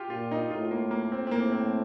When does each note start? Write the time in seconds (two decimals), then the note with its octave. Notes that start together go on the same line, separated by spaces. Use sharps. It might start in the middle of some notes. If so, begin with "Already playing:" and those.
Already playing: F4 G4
0.10 A#2 F4
0.31 D#4
0.51 A2 F4
0.71 A#3
0.91 A#3
1.12 C4
1.27 C4
1.31 A2 A#3
1.52 C4